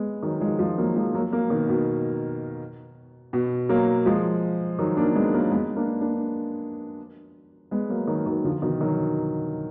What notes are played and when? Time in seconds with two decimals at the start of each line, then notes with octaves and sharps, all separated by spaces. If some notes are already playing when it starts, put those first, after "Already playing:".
Already playing: G#3 B3
0.23 D#3 F#3
0.41 F3 G#3
0.59 F3 G#3
0.78 F#3 A#3
0.96 F3 G#3
1.14 F#3 A#3
1.33 F#3 A#3
1.50 B2 D#3
1.69 B2
3.33 B2
3.69 F#3 A#3
4.06 F3 G#3
4.79 D#3 F#3
4.97 A#3 D4
5.15 G#3 B3
5.34 F#3 A#3
5.52 G#3 B3
5.76 A#3 D4
6.01 A#3 D4
7.71 G#3 B3
7.89 F#3 A#3
8.07 D#3 F#3
8.26 D#3 F#3
8.44 D3 F3
8.62 B2 D#3
8.81 D#3 F#3